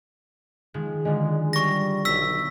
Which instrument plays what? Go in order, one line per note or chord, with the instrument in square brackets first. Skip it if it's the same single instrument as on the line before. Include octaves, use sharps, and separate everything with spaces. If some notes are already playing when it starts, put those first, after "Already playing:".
[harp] D#3 F3 G#3
[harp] D3 F3 F#3 [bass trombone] G#3
[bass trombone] G3 [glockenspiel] C#6 A#6
[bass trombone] B1 [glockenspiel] E6 B6